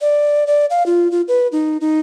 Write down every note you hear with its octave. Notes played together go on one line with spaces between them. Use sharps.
D5
D5
F5
F4
F4
B4
D#4
D#4